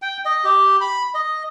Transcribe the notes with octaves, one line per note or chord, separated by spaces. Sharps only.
G5
D#5
G4
B5
D#5